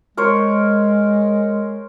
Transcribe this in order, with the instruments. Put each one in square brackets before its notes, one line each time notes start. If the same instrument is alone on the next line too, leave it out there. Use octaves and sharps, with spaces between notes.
[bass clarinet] G#3 [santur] A#4 C5 C#5